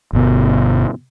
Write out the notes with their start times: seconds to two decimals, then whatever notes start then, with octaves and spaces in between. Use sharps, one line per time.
0.13 G1 B2